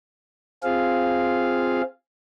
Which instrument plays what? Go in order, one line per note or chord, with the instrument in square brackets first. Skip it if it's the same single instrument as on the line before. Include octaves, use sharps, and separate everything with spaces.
[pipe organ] C4 F4 G#4 F5